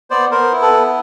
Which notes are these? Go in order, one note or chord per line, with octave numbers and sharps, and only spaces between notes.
B3 C5 D5
B3 A#4 C5
E4
A4 B4
B3